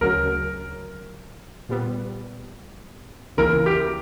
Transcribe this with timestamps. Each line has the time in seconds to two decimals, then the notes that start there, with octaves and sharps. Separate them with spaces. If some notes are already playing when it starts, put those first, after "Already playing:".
0.01 D2 C#3 F#3 C#4 A#4
1.69 A#2 G3 B3
3.37 C#2 C#3 E3 A#3 E4 A#4
3.66 G4